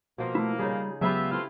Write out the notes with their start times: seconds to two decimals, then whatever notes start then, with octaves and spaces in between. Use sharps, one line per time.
0.18 B2 F3 A#3 F4
0.35 A3 E4
0.59 C#3 G3 D#4 G#4
1.01 C#2 F#3 B3 F4 G4 G#4 E5 B5
1.31 A3 C4 E4 F4